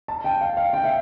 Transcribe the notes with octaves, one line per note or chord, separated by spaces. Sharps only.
A5
G5
F5
F5
G5
E5